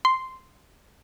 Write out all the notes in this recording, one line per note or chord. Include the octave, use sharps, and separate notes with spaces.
C6